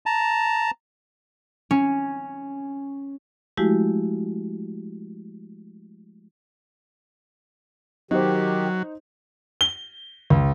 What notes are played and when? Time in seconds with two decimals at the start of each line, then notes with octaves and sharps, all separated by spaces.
0.06 A5 A#5
1.71 C#4
3.57 F3 G#3 A3 E4 F#4 G4
8.11 D#3 F#3 D#4 G4 C5
9.61 G7
10.30 C#2